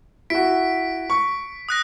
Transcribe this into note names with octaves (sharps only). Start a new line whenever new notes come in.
E4 F#4 B6 D7
C#6
D#6 F#6 A#6